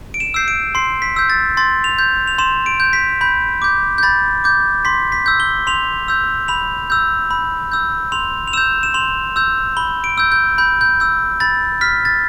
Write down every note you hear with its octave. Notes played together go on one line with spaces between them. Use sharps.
D7
E7
E6 G6 C7
D7
C6 C7
B6
E6 G6
A6
C6 A6
F7
G6
F7
C6 E7
D7
G6
B6
B5 G6
D6 G6
G6
B5 A6
D6 G6
C6 B6
B6
E6 G6
G7
C6 F7
E6 G6
B5 F7
E6 G6
B5
E6 G6
C6 F7
F7
E6 G6 E7
E7
C6 F7
E6 G6
B5 G7
D7
E6 G6
G6
B5 G6
G6
E6 G6
B5 A6
F6 B6
A6